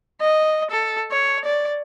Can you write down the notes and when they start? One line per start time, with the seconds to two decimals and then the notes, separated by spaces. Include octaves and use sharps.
0.21 D#5
0.71 A4
1.11 C#5
1.45 D5